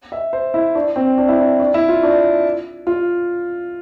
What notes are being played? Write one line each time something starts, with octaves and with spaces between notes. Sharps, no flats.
E5
C5
E4
D4
C4
D4
E4
D4
D4
E4
F4
D4
F4